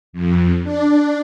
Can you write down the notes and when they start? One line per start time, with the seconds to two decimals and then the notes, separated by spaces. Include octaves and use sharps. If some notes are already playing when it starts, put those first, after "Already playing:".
0.13 F2
0.63 D4